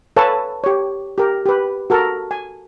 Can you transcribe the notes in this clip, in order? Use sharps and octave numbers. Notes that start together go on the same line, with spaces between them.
A4 B4 C#5 F5 G#5 A5
G4 C#5
G4 A#4
G4 B4
F#4 A4 A#4
G#5